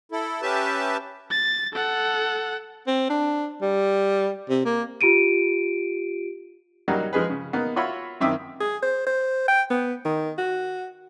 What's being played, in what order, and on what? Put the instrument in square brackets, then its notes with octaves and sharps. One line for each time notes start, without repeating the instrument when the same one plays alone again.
[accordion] E4 A4
C#4 G4 B4 E5 A5
[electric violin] A6
A4 F#5
[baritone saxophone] C4
D4
G3
C3
A#3
[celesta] F4 G4 D7 D#7
[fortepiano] F#3 G3 A#3 D#4 F#4
F3 G#3 G#4 B4
C#3
A#3 B3 D#4
F4 F#4 C#5 E5 B5
F#2 D#3 C4 E5 D6 D#6
[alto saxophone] G#4
C5
C5
G5
B3
D#3
F#4